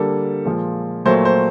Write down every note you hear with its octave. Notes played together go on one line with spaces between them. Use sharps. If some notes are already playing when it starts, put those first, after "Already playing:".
Already playing: D3 G3 A#3 A4
A#2 F3 G#3
A#2 F#3 A3 C5
C5